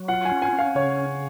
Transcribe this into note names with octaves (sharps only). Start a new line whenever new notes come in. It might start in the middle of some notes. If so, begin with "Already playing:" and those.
Already playing: F#3
F4 F#5
G#5
C#4
G#5
C#4
F5
C#3 C#5